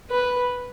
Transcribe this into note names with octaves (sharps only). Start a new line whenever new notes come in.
B4